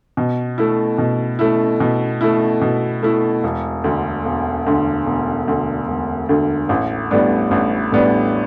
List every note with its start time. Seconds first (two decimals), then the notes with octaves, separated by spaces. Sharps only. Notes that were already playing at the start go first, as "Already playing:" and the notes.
0.17 B2
0.58 A3 E4
0.98 B2
1.39 A3 E4
1.80 B2
2.21 A3 E4
2.61 B2
3.03 A3 E4
3.44 E1
3.84 D2 D3
4.25 E1
4.66 D2 D3
5.06 E1
5.48 D2 D3
5.88 E1
6.29 D2 D3
6.69 A1
7.11 A2 G3 B3 D4
7.51 A1
7.92 A2 G3 B3 D4